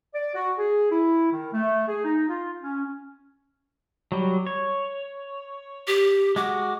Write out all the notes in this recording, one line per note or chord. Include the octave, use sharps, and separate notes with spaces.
D5
F#4
G#4
E4
D#3
A3
G#4
D#4
F4
C#4
F#3 G3
C#5
G4
G#3 F#4 D6